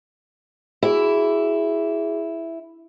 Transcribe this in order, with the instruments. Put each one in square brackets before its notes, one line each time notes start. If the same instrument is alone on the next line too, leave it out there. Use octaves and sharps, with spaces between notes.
[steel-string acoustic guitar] E4 [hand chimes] F#4 G#4